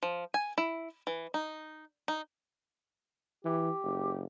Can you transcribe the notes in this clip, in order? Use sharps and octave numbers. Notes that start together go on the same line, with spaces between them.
F3
G#5
E4
E3
D#4
D#4
E3 G4
F#1